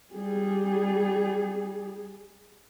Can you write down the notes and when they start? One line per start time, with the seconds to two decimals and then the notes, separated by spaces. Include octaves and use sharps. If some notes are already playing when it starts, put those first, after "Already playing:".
0.14 G3 G#4